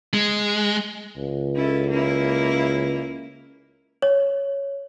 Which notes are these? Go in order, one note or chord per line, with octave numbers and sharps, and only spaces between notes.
G#3
C#2
C#4 E4 A4
A#3 C#4 E4
C#5